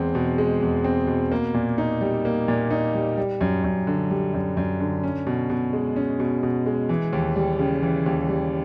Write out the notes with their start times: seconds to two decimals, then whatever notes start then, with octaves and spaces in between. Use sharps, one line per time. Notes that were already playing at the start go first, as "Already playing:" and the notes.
Already playing: E2 G#3 C4
0.15 B2
0.38 G#3
0.62 E2
0.84 C4
1.07 B2
1.32 A#3
1.54 A#2
1.78 D#4
2.01 G3
2.25 A#3
2.48 A#2
2.71 D#4
2.94 G3
3.17 G3
3.41 F#2
3.64 F#2
3.87 D3
4.10 G3
4.34 F#2
4.57 F#2
4.80 D3
5.04 C#4
5.27 B2
5.50 B2
5.73 G#3
5.96 C#4
6.20 B2
6.43 B2
6.66 G#3
6.89 E3
7.13 D#2
7.36 G3
7.59 C#3
7.83 E3
8.06 D#2
8.29 G3